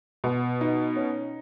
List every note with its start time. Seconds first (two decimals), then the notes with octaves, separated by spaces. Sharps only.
0.24 B2
0.61 D#4
0.96 C#4